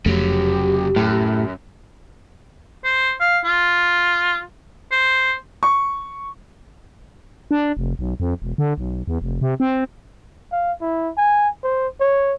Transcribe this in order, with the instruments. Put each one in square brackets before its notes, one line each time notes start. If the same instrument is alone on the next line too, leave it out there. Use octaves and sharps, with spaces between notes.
[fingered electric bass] F1 F2 A3 [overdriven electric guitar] C#3 F#3 [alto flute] G4
[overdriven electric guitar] F#2 [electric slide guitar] A2
[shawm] C5
F5
F4
C5
[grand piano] C#6
[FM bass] D4
F1
B1
F2
E1
D3
B1
E2
F1
C3
C4
[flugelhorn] F5
E4
G#5
C5
C#5